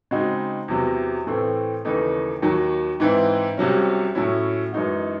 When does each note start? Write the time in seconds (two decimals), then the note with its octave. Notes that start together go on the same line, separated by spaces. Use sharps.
0.11 C#3 G#3 C4 D#4 F#4
0.68 E2 C3 F#3
1.27 A2 E3 A3 C4
1.85 D#2 C#3 E3 A3 D#4
2.42 D#2 D#3 F#3
3.00 G#2 E3 C4 E4
3.57 C2 C3 F#3 C#4
4.15 A2 F#3 C#4 E4
4.73 F#2 E3 G#3 D#4 F#4